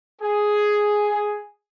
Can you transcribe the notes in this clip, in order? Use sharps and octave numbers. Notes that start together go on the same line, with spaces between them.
G#4